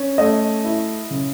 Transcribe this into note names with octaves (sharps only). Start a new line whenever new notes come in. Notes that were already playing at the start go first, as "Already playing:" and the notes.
Already playing: C#4
A3 D#5
E4
C#3